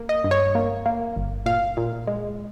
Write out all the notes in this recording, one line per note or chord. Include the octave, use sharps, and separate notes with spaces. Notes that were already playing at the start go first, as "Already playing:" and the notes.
Already playing: A#3
D#5
G2
C#5
A#3
A#3
G1
A#2 F5
A#2
G#3